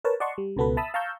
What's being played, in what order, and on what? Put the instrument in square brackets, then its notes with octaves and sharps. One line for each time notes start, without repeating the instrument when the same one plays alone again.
[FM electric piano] A#4 B4 C#5 A5
D5 D#5 F#5 A5 C6 C#6
G3
C#2 B2 B3 A4 B4
E5 A5 B5 D#6 E6
F5 A5 A#5 C#6 E6 G6